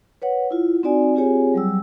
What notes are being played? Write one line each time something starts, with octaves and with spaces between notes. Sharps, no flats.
B4 C#5 F#5
E4 F4
C4 D#4 F#4 D5 G#5
C4 F4 G4 G#4 C#5 G#5
F#3 G3 E6